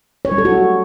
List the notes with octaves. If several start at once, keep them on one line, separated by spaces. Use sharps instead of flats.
C#5
G3
A4
F#4